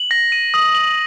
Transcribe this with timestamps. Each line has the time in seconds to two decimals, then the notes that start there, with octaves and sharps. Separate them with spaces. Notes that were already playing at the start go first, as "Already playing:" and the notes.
Already playing: F#7
0.11 A#6
0.32 D#7
0.54 D#6
0.75 F#7